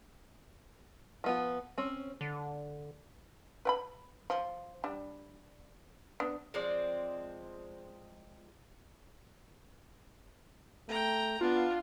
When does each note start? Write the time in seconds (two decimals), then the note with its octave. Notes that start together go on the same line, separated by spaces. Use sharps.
1.24 F3 B3 F4
1.78 C4 C#4
2.21 D3
3.65 B4 G5 B5
4.30 F3
4.84 G3 D4
6.20 B3 D4
6.54 F3 G#3 C4 D5
10.89 A3 G5 A#5
11.41 B3 D4 F4